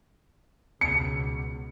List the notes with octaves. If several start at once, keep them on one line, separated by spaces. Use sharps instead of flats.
C#2 B2 C#7